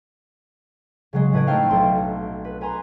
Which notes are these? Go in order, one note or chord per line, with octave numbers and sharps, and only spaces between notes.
C#3 F#3 G#3
A2 B4 D#5 G#6 D7
A3 C4 D#4 C5 F5 G5
B1 A4 C6 D7
B4
B4 G#5 A#5 C6